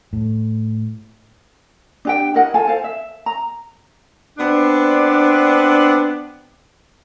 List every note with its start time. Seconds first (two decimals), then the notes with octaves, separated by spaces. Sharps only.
0.13 A2
2.05 D4 G4 G5
2.34 E4 A#4 D#5 F#5
2.54 F4 A4 F5 G#5
2.67 A4 C5 F5
2.84 E5
3.26 A#5
4.38 B3 C4 D4